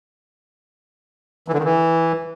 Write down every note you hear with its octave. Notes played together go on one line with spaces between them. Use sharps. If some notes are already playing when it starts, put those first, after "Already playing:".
E3
D3
D#3
E3